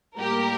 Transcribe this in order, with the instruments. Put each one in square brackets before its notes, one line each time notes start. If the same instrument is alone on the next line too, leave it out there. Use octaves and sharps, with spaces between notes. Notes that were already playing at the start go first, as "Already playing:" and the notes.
[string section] A2 G3 A#3 G4 A#4